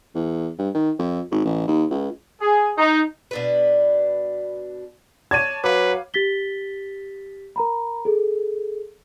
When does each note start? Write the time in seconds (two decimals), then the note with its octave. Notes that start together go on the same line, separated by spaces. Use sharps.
0.15 E2
0.59 G2
0.75 D#3
0.99 F2
1.31 G#1
1.45 A1
1.68 D#2
1.90 C#2
2.41 G#4
2.78 D#4
3.31 B2 D4 B4
5.31 C#5 D5 A5 G#6 D#7
5.64 F#3 B4 F5 D6
6.14 G4 A6 B6 G7
7.56 A#4 A#5 B5
8.05 G#4 A4